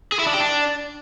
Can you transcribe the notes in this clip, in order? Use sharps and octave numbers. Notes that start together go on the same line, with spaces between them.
G#4
E4
D4
G4
D4